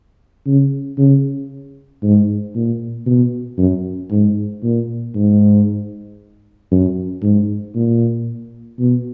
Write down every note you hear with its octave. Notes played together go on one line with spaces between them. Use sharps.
C#3
C#3
G#2
A#2
B2
F#2
G#2
A#2
G#2
F#2
G#2
A#2
B2